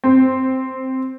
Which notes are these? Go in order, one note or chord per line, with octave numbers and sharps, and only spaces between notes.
C4